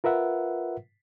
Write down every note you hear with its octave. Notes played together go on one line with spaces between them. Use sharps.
F4 A#4 B4 E5 F#5